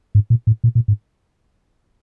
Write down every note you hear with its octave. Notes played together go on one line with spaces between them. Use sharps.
G#2
A#2
A2
A#2
A#2
G#2